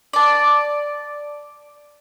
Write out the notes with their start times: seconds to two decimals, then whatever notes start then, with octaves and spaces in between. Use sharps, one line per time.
0.13 D5 A5